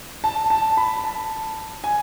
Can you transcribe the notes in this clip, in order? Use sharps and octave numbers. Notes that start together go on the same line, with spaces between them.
A5
A5
B5
A5
G#5